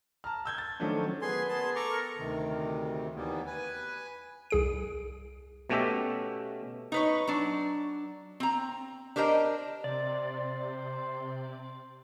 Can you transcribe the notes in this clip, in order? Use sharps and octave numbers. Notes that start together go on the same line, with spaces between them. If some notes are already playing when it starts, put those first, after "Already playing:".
A5 A#5 F6
E6 G6 G#6
A6
D#3 F3 F#3 A3 C#4 D4
A#2 B3 G#4 B4 G#5 C6
G#4 A5 C6
G#4
A4 A#5 C#6 D6
A#4
D2 C3 D#3
D#2 E3 G3 A#3 B3
B4 G#5
C2 G#4 D7
B2 A3 C#4 G4 E5
D#4 B4 C#5
F#3 D4
C4 A#5
D4 G4 A#4 C5 D#5
C3 C5 D5